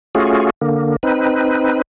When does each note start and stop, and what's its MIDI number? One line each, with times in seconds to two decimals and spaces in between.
0.15 0.50 57
0.15 0.50 61
0.15 0.50 65
0.15 0.50 66
0.15 0.50 68
0.61 0.96 50
0.61 0.96 58
1.03 1.82 60
1.03 1.82 63
1.03 1.82 71